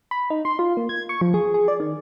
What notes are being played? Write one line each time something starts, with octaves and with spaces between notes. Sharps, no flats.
B5
D#4
C6
F4
A#3
G#6
C#6
F3
G#4
G#4
D5
D#3